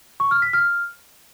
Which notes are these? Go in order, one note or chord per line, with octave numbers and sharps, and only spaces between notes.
C#6
F6
B6
F6